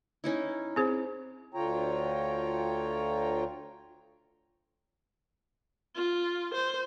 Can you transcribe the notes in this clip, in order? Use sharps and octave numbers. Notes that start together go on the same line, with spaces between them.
C#4 D#4 E4
C4 G#4 C5
D2 D3 F4 C#5 G5 A#5
F4
C5